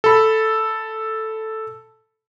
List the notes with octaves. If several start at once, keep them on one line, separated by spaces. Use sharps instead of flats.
A4 B5